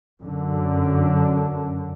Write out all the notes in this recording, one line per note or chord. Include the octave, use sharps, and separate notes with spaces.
F#2 D3